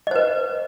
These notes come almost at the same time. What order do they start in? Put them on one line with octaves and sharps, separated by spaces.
D#5 C5 B4